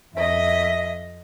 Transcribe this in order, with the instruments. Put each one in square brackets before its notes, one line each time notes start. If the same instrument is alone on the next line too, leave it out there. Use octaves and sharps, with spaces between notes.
[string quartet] F2 D#5 [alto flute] E5